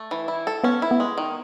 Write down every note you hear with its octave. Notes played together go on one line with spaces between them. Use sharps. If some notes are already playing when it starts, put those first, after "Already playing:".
Already playing: A3
E3
E4
A4
B3 C#4
E4
B3
G#3
D#3